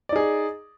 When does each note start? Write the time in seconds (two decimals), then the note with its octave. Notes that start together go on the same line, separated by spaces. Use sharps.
0.09 D5
0.12 D#4
0.16 G#4